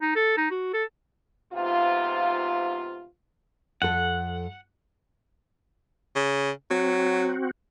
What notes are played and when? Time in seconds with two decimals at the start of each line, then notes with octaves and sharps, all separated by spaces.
0.01 D#4
0.15 A4
0.37 D#4
0.50 F#4
0.74 A4
1.53 G#2 C3 B3 F4
3.82 F2 A4 F#5
6.15 C#3
6.71 F#3 C4 F#4